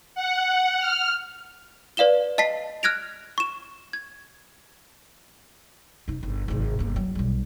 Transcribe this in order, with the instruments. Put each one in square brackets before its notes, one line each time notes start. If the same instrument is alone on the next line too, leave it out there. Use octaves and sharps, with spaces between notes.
[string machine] F#5
F6
[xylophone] B4 D5 F5 E7 G7
D#5 A5 B6 C7
F6 F#6 G#6 A#6 D7 F7
C#6 E7
G#6
[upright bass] F1 D#4
G1
G#1 C3
G1 A#3
F#3
B1 G3